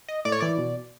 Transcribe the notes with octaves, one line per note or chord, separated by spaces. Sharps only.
D#5
A2 D5
C#5
E3 D5
B2